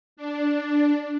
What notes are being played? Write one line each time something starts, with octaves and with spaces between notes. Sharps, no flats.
D4